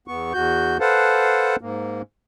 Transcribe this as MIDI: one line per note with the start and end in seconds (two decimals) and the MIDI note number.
0.08 0.33 40
0.08 0.33 59
0.08 0.33 85
0.33 0.77 40
0.33 0.77 66
0.33 0.77 91
0.80 1.56 69
0.80 1.56 71
0.80 1.56 72
0.80 1.56 77
0.80 1.56 78
0.80 1.56 81
1.61 2.02 44
1.61 2.02 58